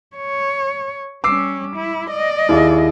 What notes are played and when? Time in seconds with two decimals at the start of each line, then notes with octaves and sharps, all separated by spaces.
0.16 C#5
1.24 G3 C#4 D6 E6 C7
1.76 E4
2.10 D5 D#5
2.49 D#2 E4 G#4